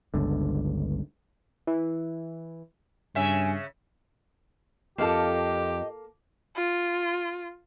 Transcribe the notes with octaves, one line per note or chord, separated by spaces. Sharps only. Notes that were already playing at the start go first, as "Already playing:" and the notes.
G1 C#2 D3
E3
G2 C#3 E5 G#5
F2 A#3 G4 A4 D#5 F5 A5
F4